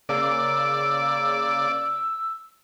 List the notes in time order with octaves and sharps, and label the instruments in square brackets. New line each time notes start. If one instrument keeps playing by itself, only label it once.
[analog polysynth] C#3 A#3 [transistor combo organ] D5 [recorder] E6